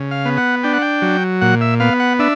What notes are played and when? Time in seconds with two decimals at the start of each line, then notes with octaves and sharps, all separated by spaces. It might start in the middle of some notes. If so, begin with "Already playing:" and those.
Already playing: C#3
0.11 F5
0.25 B3
0.37 F#5
0.64 D4 G5
0.73 F#5
0.82 G5
1.02 F#3
1.41 A#2 F#5
1.61 E5
1.80 B3 F5
2.00 F#5
2.19 D4 E5